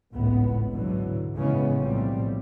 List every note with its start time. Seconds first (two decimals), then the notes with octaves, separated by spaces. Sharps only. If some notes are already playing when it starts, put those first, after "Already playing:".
0.13 G#1 C#2 A2 B3
0.71 G#2 B2 D3 E3 F#3
1.35 A2 C#3 E3 G#3 B3 C#4
1.80 B1 A2 F3 G3 A3 C4